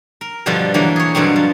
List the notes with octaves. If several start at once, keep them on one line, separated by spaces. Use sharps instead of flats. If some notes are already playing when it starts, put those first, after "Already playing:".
A#4
G2 B2 D3 F3 G3
D3 E3 F#3 A#3
G#4 C#5
G2 B2 D3 F#3 C4
F3